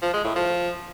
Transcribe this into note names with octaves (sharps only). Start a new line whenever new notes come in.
F3
G#3
A2
F3